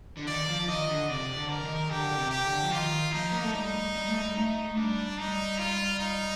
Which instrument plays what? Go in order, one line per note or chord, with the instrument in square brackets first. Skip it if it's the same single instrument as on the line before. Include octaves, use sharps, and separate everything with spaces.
[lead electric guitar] D3
[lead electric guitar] D#3 [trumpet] D5
[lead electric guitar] F3
[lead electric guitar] D#3 [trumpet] D#5
[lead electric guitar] D3
[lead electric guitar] C3 [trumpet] D5
[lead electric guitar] D3
[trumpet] A#4
[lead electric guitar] D#3
[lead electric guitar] D3 [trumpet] G4
[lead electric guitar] D3
C3
[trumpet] G4
[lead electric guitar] D3
F3
[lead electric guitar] D#3 [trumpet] F4
[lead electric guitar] F3 [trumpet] D#4
[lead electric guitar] A#3
A3
[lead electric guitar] G3 [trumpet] D#4
[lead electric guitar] G3
A3
G3
[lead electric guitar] A3 [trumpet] D#4
[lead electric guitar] G3 [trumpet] D4
[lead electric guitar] G3 [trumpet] D#4
[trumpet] F4
D#4